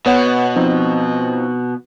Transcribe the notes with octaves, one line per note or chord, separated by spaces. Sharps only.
B2 B3 C#5 F#5
F3 C4 D#4